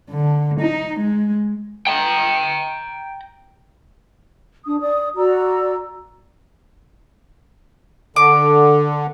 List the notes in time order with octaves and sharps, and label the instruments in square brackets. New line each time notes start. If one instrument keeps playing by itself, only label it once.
[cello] D3
D#4
G#3
[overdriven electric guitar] G5 A#5
[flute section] D4 D#6
D5 D#6
F#4 D5 A#5 E6
[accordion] D3 [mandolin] D6